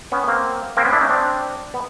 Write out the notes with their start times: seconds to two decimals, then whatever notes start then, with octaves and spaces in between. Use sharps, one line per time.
0.12 B3 C#4
0.28 A#3 C4
0.77 A#3 C4
0.85 B3 C#4
0.92 D4 E4
1.01 C#4 D#4
1.09 C4 D4
1.74 B3